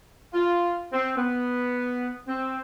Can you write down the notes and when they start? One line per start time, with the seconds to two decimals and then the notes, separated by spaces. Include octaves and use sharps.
0.33 F4
0.92 C4
1.17 B3
2.28 C4